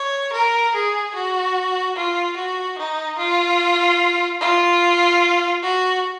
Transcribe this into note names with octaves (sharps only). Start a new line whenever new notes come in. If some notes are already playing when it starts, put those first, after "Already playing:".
Already playing: C#5
A#4
G#4
F#4
F4
F#4
D#4
F4
F4
F#4